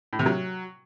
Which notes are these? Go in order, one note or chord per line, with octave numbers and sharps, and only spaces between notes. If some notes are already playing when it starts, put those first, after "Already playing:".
A2
C3
F#3